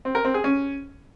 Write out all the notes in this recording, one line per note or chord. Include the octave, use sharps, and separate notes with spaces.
C4
A#4
C4
G#4
C#4